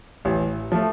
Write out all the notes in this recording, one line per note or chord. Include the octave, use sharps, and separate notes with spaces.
A1
F3 A3